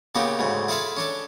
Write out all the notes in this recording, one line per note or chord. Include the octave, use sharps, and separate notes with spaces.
A#2 C#3 B3 D#4 G4
D2 G#2 C#3
E4 F4 G#4 A4 E5 F5
C#4 D4 A4